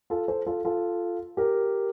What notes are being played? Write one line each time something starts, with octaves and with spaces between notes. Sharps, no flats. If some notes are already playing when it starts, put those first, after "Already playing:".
F4 A4
A4 C5
F4 A4
F4 A4
G4 A#4